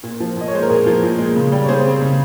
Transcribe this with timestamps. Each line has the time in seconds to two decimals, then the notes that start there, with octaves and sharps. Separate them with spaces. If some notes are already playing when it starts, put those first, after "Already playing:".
0.03 A#2
0.20 F3
0.37 A#2 D#5
0.48 C#5
0.53 G#3 C5
0.62 A#4
0.70 A#2 G#4
0.86 F3
1.03 A#2
1.19 G#3
1.36 C#3
1.52 G3
1.65 C#5
1.69 C#3 G#4 C5
1.86 C4
2.02 C#3